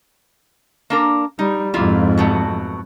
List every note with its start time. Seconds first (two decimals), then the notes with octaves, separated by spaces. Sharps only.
0.90 A#3 D4 A#4
1.39 G3 D#4
1.74 F2 G#2 A#3 E4 F4
2.18 B2 F#3 A3